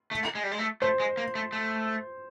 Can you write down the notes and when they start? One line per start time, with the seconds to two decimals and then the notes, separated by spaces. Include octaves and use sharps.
0.11 A3
0.35 G#3
0.43 G3
0.51 G#3
0.59 A3
0.82 A3 C5
1.00 G#3
1.17 A#3
1.35 A3
1.53 A3